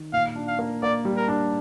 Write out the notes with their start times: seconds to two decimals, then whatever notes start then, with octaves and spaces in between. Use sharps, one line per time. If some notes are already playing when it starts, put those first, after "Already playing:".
Already playing: D#3
0.13 A#2 F5
0.36 D4
0.48 F5
0.59 A#3
0.83 A#3 D5
1.05 G3
1.17 A#4
1.28 D4